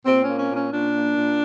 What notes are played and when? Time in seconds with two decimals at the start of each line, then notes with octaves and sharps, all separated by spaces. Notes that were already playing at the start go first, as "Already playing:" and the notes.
0.05 A#2 C4
0.21 C#4
0.27 A#3
0.38 C#4
0.49 A#2
0.55 C#4
0.71 A#2 D4
0.93 A#3
1.15 A#2